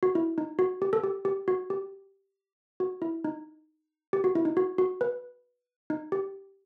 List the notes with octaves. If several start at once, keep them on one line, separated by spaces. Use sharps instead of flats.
F#4
E4
D#4
F#4
G4
A4
G4
G4
F#4
G4
F#4
E4
D#4
G4
F#4
E4
D#4
F#4
F#4
B4
D#4
G4